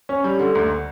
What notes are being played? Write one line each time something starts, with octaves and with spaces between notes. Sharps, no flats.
C#4
G3
D3
D2